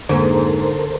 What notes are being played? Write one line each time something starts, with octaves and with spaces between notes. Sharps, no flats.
F2 G#2 D3 A#3 A4 A#4 C5